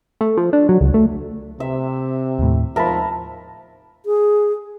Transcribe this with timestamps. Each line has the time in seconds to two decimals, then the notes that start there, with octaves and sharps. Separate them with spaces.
0.21 A3
0.37 F3
0.53 D4
0.69 F#3
0.81 C#2
0.94 A3
1.60 C3 E5
2.39 D#2 A2
2.76 E2 G#2 F3 A#4 E5 A5 B5
4.06 G#4